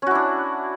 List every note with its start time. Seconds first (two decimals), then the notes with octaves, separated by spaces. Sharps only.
0.02 C#4
0.07 F#4
0.11 E4
0.15 D4